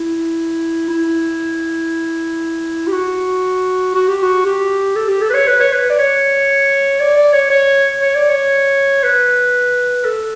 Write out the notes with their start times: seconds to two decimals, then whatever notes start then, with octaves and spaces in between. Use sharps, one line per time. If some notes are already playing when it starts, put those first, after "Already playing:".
Already playing: E4
0.89 E4
2.87 G4
2.92 F#4
3.94 F#4
4.08 G4
4.22 F#4
4.46 G4
4.96 A4
5.09 G4
5.22 A4
5.30 B4
5.34 C#5
5.47 B4
5.60 C#5
5.73 B4
5.90 D5
5.98 C#5
7.00 D5
7.17 D5
7.33 C#5
7.51 C#5
8.01 C#5
8.15 D5
8.29 C#5
9.03 B4
10.05 A4